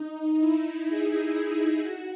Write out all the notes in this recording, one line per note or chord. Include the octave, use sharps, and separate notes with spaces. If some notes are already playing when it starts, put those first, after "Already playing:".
Already playing: D#4
E4
G#4
G#4
E4
F#4